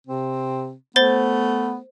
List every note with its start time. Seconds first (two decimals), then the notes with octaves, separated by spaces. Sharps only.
0.07 C3 C4
0.96 A3 B3 C5 A6 G7